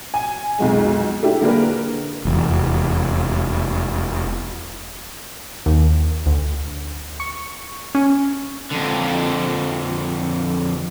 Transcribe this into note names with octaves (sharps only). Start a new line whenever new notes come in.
G#5
B1 F2 G#3
A3 D4 E4 G4
D3 A#3 D4 G#4 A#4 B4
F1 E2
D#2
D2
C#6
C#4
F2 D3